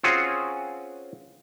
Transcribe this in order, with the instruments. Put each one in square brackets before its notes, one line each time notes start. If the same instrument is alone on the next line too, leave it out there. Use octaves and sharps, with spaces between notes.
[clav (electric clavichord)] C4 C#4 F4 F#4 G#4